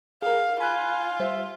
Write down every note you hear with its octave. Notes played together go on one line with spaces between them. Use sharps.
G#4 A#4 F5
F4 G#5 B5 F#6
G3 C5 E5